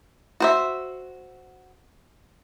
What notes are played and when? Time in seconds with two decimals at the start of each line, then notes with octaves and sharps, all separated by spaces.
0.40 F#4 C5 E5